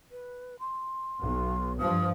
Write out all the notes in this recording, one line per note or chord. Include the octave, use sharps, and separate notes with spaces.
B4
C6
B1
G2 F3 D#6